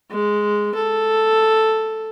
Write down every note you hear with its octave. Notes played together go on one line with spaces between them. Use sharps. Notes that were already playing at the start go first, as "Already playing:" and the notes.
G#3
A4